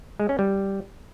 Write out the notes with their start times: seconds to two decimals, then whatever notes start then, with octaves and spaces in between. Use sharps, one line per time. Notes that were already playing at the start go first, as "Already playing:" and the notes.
0.20 G#3
0.29 C#4
0.39 G3